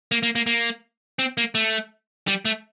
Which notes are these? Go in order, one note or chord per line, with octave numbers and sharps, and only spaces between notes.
A#3
A#3
A#3
A#3
C4
A#3
A3
G3
A3